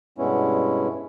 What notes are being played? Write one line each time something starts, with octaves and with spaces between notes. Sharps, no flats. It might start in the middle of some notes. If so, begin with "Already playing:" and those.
G2 B2 G#3 B3 C#4 E4